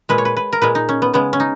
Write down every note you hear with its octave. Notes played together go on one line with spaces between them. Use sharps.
A#2 G#3 B4
C#5
B4
B4
A#4
A#2 G#3 B4
D#4
C#4
B3
C#3 G#3 B3
C#4
D#4